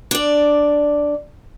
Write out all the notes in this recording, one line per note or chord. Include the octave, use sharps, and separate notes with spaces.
D4 D5